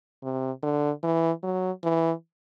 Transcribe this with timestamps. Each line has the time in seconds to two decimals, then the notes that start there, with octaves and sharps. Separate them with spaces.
0.23 C3
0.63 D3
1.03 E3
1.43 F#3
1.83 E3